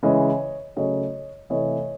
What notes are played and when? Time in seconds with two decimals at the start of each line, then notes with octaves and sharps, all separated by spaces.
0.03 C#3 E3 G#3 C#5 D#5
0.76 C#3 F#3 A3 C#5 D#5
1.50 C3 E3 A3 C#5 D#5